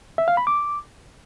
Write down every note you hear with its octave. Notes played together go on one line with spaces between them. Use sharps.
E5
F5
B5
D6